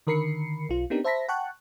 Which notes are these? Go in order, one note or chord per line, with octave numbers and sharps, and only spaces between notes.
D3 D#3 A#4 B5 C7 C#7
B1 F4
B3 C4 D4 D#4 G4 A#4
C5 E5 A5 B5 A#6 B6
F#5 G5 A5 C#6 F#6